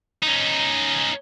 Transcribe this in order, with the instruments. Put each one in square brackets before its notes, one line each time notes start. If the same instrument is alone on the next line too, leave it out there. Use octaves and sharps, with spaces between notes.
[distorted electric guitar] C#4 D#4